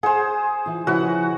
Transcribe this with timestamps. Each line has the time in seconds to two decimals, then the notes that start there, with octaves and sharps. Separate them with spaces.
0.03 G#4 C5 F#5
0.66 E3 F4
0.87 C#3 F3 E4 F#4 B4 F#5